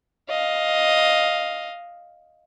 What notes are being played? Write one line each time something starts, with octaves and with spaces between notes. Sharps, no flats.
D#5 F5